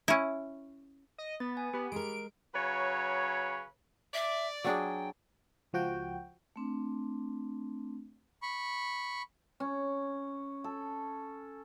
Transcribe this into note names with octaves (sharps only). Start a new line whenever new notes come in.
C#4 E4
D#5
B3 A6
G#5
B3 G4 B5
G#3 A#4 D7
C#3 F#3 B4 C#5
D5 E5
F#3 D4 G#4 G5
C#2 F3 F#4 G5
A3 C4 D4
B5 C#6
C#4
A4